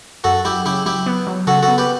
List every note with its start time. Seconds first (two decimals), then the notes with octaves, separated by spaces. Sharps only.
0.24 F#2 F#4 A4
0.45 F#3 E4 G4
0.65 C#3 E4 G4
0.86 F#3 E4 G4
1.06 B3
1.27 F#3
1.47 C#3 F#4 A4
1.63 F#4 A4
1.68 B3
1.78 G4 B4